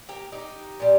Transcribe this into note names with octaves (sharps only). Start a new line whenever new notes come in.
G4 A#4
D#4 G4
A#2 G3